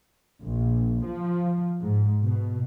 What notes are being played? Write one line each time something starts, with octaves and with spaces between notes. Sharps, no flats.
A#1
F3
G#2
B2